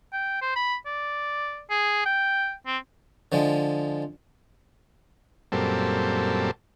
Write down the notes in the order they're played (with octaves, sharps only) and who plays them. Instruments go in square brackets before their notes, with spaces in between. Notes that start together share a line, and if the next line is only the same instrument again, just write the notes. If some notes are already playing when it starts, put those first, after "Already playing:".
[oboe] G5
C5
B5
D5
G#4
G5
C4
[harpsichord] D3 F3 G#3
[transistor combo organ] F#2 A#2 G3 C4 A4